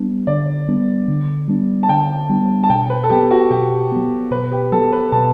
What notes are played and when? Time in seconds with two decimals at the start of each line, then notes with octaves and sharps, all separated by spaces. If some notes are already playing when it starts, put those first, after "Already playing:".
Already playing: G3 B3 D4
0.27 D3 D5
0.68 G3 B3 D4
1.08 D3
1.48 G3 B3 D4
1.83 A5
1.89 D3 G5
2.29 G3 B3 D4
2.63 A5
2.70 B2 G5
2.90 B4
3.03 A4
3.10 F#3 B3 G4
3.31 F#4
3.50 B2 G4
3.92 F#3 B3
4.31 B2 B4
4.52 G4
4.72 F#3 B3 A4
4.93 B4
5.12 B2 A5